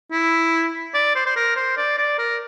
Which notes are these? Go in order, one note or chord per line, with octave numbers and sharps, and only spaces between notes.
E4
D5
C5
C5
A#4
C5
D5
D5
A#4